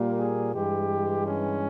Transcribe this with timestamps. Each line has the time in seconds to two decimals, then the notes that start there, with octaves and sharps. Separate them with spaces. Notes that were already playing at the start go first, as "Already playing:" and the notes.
Already playing: A#2 G3 A#3
0.17 G#4
0.54 G2 E3 G#3 G4
1.26 C#4